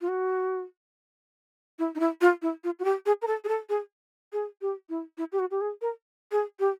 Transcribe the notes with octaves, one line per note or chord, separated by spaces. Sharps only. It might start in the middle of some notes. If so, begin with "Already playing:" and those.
F4
F#4
E4
D#4
E4
F4
E4
F4
F#4
G4
G#4
A#4
A4
G#4
A4
G#4
G#4
G4
E4
E4
G4
F#4
G4
G#4
A#4
G#4
G4